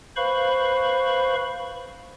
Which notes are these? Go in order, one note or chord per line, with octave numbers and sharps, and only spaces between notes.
B4 C5 F5 B5 C#6